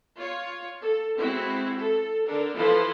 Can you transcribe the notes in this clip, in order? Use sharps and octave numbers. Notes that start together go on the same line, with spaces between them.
F4 C#5
A4
G#3 C4 E4 F#4
A4
D3 D4 A4 A#4
E3 F3 E4 A4 B4 C6